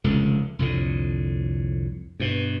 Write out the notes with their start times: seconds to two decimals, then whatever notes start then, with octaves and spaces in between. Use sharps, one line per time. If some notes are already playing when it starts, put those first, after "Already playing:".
0.04 F1 C#2 D3
0.59 C2 F2 A2 D3
2.20 G2 B2